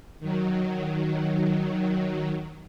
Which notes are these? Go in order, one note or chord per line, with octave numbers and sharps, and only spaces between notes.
D#3 F#3